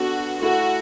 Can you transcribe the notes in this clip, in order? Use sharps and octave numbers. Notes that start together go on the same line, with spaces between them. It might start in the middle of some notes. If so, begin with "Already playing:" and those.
Already playing: B3 D4 F#4 A4
A3 E4 F#4 A4